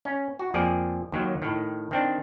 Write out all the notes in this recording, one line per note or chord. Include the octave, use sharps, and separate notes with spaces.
C#4
F#4
F2 F3 A#3 G#4 D5
D#2 D#3 F#3
A2 D#3
D#3 C4 D4